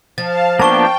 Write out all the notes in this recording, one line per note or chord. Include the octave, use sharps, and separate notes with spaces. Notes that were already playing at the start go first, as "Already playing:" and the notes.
F3 F5 A5 A6
A#3 B3 D4 G5 A5 C#6 G7